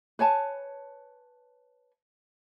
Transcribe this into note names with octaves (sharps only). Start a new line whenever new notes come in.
B4 C#5 G#5 A5